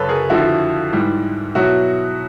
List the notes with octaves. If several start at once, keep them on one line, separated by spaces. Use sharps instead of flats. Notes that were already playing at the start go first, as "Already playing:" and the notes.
Already playing: F#2 C#3 F#3 A4 B4 C#5
G#4 A#4
F2 D3 F3 E4 F#4
G#2 E3 G3
B2 F#3 E4 F#4